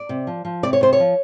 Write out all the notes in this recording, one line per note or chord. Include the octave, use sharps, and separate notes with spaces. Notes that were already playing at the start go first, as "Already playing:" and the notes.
Already playing: D5
C3
F3
F3
C3 D5
C#5
C3 C5
C#5
F3